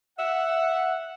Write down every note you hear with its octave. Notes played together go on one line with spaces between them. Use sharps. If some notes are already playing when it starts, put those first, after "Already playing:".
E5 F#5